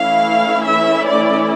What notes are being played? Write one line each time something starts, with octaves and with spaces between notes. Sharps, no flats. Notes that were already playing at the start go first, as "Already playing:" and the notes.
Already playing: E3 A3 C#4 E4 F5
E5
D5